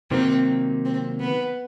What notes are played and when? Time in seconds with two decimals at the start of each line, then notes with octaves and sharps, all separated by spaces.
0.11 C3 D#3 F#3 A#3 C4
0.85 C4
1.20 B3